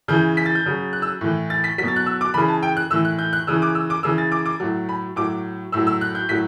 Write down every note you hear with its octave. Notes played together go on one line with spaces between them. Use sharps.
C#3 E3 G6
B6
A6
G6
C#3 F#3
F#6
E6
A2 E3
A6
B6
F#3 B6
B2 A6
F#6
E6
D6
C#3 E3 B5
A5
G5
F#6
A2 E3 E6
F#6
G6
F#6
C#3 E3 E6
D6
E6
D6
C#3 E3 E6
A6
D6
D6
A2 F#3
B5
A2 F#3 D6
A2 F#3 E6
E6
F#6
G6
A2 F#3 B6